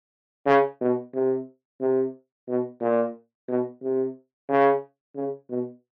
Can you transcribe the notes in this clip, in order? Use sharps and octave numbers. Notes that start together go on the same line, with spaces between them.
C#3
B2
C3
C3
B2
A#2
B2
C3
C#3
C#3
B2